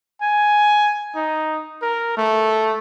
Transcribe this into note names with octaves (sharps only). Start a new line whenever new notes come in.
G#5
D#4
A#4
A3